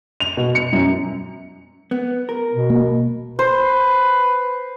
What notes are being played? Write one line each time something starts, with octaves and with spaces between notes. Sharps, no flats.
F7
B2
C#7
F#2
B3
A#4
B2
A#3
B4 C5